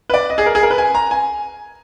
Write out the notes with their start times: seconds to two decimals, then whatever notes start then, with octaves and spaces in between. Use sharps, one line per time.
0.10 B4
0.14 D5
0.30 D#5
0.38 G#4
0.46 A#4
0.55 G#4
0.63 A#4
0.70 B4
0.78 G#5
0.94 A#5
1.11 G#5